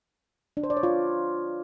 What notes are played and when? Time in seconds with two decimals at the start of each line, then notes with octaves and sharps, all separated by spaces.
0.57 D4
0.63 C5
0.70 D5
0.77 C#5
0.83 F4